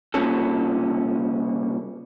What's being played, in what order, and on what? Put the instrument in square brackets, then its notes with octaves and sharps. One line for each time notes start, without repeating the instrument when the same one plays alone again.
[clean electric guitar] C2 A#2 C#3 C#4 A4